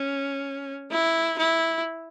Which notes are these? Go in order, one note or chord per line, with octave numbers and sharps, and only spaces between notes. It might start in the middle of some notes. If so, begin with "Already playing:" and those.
Already playing: C#4
E4
E4